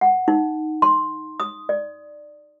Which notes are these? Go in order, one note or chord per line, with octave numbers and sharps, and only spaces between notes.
F#5
D#4
C6
D#6
D5